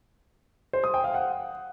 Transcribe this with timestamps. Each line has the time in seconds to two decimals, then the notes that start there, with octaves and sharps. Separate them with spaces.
0.73 C5
0.84 D#6
0.94 G5
1.04 F5
1.14 F#5